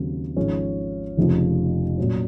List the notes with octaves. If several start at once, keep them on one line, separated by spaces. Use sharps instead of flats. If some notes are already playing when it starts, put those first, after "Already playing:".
Already playing: D#2 C#3 F#3 C4
G#1 G#2 F3 G#3 C#4
F1 F2 C#3 F3
A#2 F#3 C#4